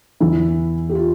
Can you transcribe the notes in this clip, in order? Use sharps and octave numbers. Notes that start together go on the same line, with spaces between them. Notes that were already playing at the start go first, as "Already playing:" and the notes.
E2 E3 E4
G4
F4